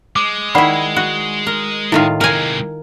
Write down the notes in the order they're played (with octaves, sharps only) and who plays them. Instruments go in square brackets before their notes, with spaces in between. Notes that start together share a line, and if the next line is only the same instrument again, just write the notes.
[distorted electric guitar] G#3 [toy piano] D6
[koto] D#3 E4 [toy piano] D5 F#5 B5
[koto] F#4
A#4
[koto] A2 D#3 F4 [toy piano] E4
[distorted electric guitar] C3 G#3 [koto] A#4 G#5